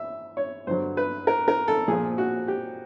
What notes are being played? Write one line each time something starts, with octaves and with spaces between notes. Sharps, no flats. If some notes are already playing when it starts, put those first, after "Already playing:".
Already playing: E5
C#5
G2 D3 F#3 C5
B4
A#4
A#4
A4
A#2 F3 G#4
F#4
G4